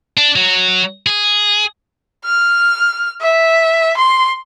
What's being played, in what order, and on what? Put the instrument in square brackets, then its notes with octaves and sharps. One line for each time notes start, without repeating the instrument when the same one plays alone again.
[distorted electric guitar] D4
F#3
G#4
[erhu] F6
E5
C6